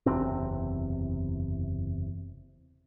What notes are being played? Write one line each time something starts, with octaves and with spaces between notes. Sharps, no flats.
F#1 E2 C3 C4